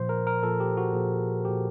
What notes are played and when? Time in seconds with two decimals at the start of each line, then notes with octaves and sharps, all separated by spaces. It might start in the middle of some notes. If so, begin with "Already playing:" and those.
Already playing: A#2 F3 C5
0.09 A#4
0.27 A#4
0.43 A#2 F3 A4
0.60 G4
0.77 F#4
0.93 A#2 F3 G#4
1.45 A#2 F3 G4